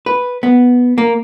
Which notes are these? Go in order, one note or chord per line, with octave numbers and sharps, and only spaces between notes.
B4
B3
A#3